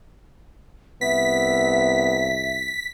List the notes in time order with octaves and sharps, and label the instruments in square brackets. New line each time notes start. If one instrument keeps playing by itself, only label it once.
[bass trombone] C2 [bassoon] B3 [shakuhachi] E5 [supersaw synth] B6